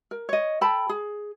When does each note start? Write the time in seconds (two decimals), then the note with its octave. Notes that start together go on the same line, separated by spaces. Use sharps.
0.11 A#4
0.29 C#5 D#5
0.61 A4 G5 A5 B5
0.89 G#4